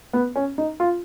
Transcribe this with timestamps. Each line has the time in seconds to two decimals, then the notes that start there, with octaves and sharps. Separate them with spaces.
0.13 B3
0.36 C#4
0.58 D#4
0.80 F4